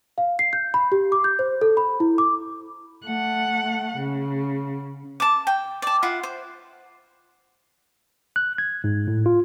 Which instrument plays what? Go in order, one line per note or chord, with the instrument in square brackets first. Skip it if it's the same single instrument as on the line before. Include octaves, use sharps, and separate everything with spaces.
[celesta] F5
C7
G6
B5
G4
D6
G6
C5
A4
B5
E4
D6
[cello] A3 F#5
C#3
[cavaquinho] A5 D6
G5
D5 A5
E4 F4 F#5
C5
[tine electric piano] F#6
G#6
G#2
A2
F4